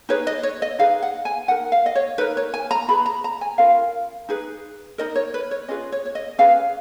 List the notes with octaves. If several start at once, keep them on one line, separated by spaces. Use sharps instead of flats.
D#4 G#4 B4 C#5
D#5
C#5
D#5
D#4 G#4 B4 F5
F#5
G#5
D#4 A#4 F#5
F5
D#5
C#5
D#4 A#4 B4
C#5
G#5
A#5
F4 G#4 B4 B5
A#5
A#5
G#5
C#4 F4 A#4 F5
D#4 G#4 B4
D#4 A#4 D#5
C#5
B4
C#5
C#4 F4 G#4 B4 D#5
C#5
C#5
D#5
C#4 G#4 B4 F5